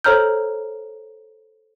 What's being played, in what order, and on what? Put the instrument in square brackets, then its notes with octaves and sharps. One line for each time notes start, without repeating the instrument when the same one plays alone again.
[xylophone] A4 C5 C#5 A#5 F6 G6